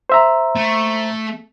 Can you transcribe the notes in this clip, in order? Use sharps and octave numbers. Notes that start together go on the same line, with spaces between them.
C5 E5 A#5
A3